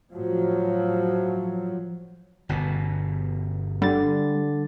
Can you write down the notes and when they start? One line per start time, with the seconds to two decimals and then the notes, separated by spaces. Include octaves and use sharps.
0.11 A2 F3 F#3
2.49 G1 B2
3.82 D3 G3 A6